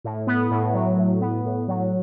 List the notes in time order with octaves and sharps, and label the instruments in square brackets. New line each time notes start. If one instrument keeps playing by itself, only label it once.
[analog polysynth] A2
B3
A2
F#3
A2
B3
A2
F#3